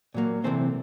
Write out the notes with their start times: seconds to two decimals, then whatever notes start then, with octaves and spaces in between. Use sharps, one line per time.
0.14 A#2 F#3 A#3
0.44 C3 E3 A3 C4 C5